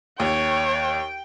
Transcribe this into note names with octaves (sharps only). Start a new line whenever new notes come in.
D#2 C#5 G5